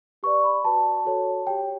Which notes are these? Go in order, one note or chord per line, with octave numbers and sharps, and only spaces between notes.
G4 B4 D5 C#6
B5
F#4 B4 D5 A5
F#4 A4 C#5
G4 C#5 G5